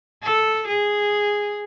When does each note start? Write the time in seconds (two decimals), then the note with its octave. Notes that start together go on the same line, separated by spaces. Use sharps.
0.23 A4
0.68 G#4